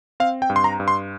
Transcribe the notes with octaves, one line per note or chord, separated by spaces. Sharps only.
C4 F5
G5
G2
C6
A#5
G2
C6